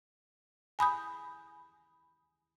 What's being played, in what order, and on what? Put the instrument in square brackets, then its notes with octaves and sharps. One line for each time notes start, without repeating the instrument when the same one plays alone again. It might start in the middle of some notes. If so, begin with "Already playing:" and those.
[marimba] G#5 B5 D#6 G6